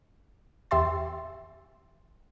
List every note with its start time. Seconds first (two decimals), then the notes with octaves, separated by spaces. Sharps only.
0.71 E2 G4 E5 C6 A6